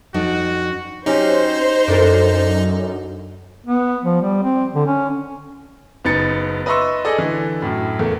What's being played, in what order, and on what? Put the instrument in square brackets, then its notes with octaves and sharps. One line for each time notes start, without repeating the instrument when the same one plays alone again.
[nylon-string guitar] F2 D4 D#4 [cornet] F#4
[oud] F#3 C#4 G4 [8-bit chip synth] D#4 [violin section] C5
[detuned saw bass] F#2 [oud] D4 A4 A#4
[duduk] B3
F3
G3
C4
D3
C#4
[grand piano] F#1 B3 D#4 A6 C#7
B4 D#5 E5 C6 C#6 E6
G#4 A4 D5 D#5
D3 E3
F#2 A2
E2 A3 A#3